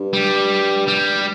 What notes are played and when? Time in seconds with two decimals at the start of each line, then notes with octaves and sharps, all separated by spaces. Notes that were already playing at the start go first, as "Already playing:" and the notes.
Already playing: G2
0.13 G3
0.88 G3